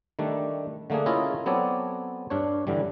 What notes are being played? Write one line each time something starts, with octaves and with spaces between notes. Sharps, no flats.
D#3 G3 A3 D4
D3 A3 A#3 D4 G#4
C#4 E4 F4 G#4 A#4 D#5
F#3 B3 C4 A4 C#5 D5
G2 D4 C#5
G2 D3 E3 G3